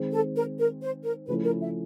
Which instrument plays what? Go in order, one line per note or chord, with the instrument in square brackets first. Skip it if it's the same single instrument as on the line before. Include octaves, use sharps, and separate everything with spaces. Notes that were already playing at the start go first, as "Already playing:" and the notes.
Already playing: [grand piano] D#3 G#3 C4
[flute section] A4
A#4
A#4
C5
A#4
[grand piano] C#3 F3 A3 C#4 E4 [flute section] B4
[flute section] A#4
E5